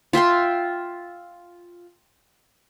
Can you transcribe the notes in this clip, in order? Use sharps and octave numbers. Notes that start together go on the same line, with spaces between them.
F4 E5 G5 C6